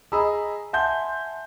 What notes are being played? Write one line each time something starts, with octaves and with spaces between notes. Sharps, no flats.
G#4 D#5 A#5 B5 E6
E5 F#5 G#5 A5 C6 G6